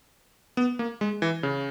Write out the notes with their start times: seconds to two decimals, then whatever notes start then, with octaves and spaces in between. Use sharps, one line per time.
0.57 B3
0.79 A#3
1.01 G#3
1.22 E3
1.43 C#3